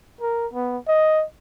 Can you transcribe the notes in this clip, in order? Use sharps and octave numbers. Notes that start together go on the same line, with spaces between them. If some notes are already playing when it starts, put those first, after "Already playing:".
A#4
B3
D#5